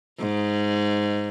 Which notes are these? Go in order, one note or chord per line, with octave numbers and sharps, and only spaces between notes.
G#2